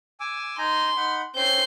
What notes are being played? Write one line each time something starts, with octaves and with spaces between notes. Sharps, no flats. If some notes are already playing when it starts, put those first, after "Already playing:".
G#5 D6 E6
D#4 G#5 A#5 C6
D#4 F#5 B5
C4 C#4 C5 G6 C7